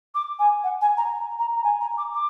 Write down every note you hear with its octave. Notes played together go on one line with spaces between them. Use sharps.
D6
G#5
F#5
G#5
A#5
A#5
A#5
G#5
A#5
D6
D6